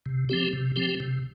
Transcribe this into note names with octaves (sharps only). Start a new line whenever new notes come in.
C3
F3 C4 G4
C3
F3 C4 G4
C3